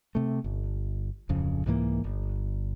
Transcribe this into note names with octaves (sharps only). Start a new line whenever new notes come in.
C3 A3
G1
D1 F2 C#3
C2 G#2 E3 A#3
G1